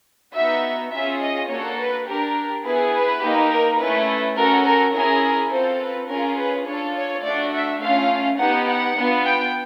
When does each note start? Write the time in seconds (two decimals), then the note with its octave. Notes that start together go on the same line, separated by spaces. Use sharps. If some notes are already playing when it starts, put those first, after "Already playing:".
0.34 B3 D#4 F#4 E5
0.92 C#4 F4 G#4 E5
1.21 D#5
1.49 A#3 D4 F#4 A4 C#5
1.79 B4
2.07 D4 G4 A#4
2.64 B3 E4 G#4 B4
2.94 B4
3.22 A#3 D#4 G4
3.51 A#4
3.79 A3 C#4 E4 B4
4.37 C#4 F#4 A4 A#4
4.66 A#4
4.94 C#4 E4 G#4 A#4
5.51 C4 F4 A4 C5
5.81 B4
6.09 C#4 F4 G#4 A#4
6.38 B4
6.67 D4 F4 A4 C#5
6.96 C#5
7.24 A3 D4 F#4 D5
7.54 E5
7.81 A3 C#4 F4 F5
8.39 B3 D#4 G4 F#5
8.67 F#5
8.97 B3 D4 F4
9.25 G5